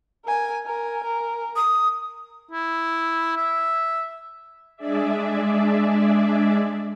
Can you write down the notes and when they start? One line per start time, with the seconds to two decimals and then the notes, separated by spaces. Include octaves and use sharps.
0.25 A#4 G#5
0.66 A#4 G#5
1.03 A#4
1.56 D#6
2.51 E4
3.37 E5
4.76 G#3 D4 G#4 D5 E5